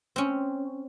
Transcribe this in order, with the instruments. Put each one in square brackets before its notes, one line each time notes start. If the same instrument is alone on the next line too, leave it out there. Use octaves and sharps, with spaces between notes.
[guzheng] C4 C#4